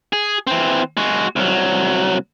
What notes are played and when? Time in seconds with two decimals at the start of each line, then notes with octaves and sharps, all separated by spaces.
0.13 G#4
0.47 E3 C4
0.97 G#3 F#4
1.36 C2 F#3